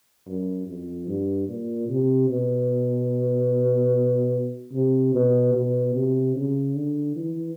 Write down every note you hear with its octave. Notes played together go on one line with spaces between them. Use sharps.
F#2
F2
G2
A#2
C3
B2
C3
B2
B2
C3
C#3
D3
E3